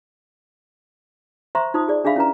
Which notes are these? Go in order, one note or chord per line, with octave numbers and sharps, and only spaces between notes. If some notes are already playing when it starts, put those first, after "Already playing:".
C5 E5 A#5 C6 C#6
D#4 F4 C5 D#6
G#4 D5
D4 G#4 E5 F5 B5
C#4 E4 B4 A#5